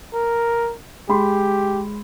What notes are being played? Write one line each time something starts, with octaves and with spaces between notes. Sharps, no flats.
A#4
G#3 G4 B5 C6